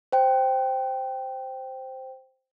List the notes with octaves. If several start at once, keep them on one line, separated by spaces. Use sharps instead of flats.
C5 G5